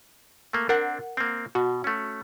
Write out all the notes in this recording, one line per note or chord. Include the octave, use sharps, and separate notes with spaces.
A3 A#3
C4 D4 A#4 F#5
A#3 C4
B2 F#4
A3 C#4